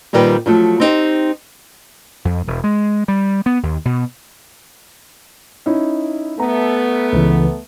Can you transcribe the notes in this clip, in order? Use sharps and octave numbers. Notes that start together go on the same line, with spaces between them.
A#2 D#3 G3 C4 B4 G5
F3 F#3 A3
C4 D#4 G4 C5
F2
E1
G#3
G3
B3
D#2
B2
C#4 D#4 E4
A3 B3 A#5
C#2 C#3 E3